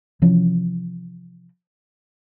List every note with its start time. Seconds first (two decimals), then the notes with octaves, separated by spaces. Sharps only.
0.22 C3 E3 F3 C#4